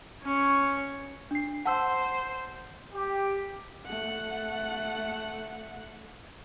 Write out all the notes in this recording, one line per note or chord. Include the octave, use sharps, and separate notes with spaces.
C#4 C#5
D4 C7
C5 F#5 A5 E6
G4
A3 F#5